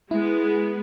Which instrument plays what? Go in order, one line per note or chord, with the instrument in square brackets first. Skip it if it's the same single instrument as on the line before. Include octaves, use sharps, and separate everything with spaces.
[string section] G#3 B3 [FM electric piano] E4